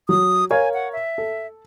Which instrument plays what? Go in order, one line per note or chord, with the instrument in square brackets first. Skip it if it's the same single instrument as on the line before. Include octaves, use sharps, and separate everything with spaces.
[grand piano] F#3 [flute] D#6
[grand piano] A#4 C#5 F5 [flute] G#5
[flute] F#5
E5
[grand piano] A4